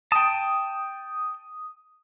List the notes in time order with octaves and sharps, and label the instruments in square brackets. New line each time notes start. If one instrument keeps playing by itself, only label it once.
[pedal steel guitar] G5 A5 [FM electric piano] D#6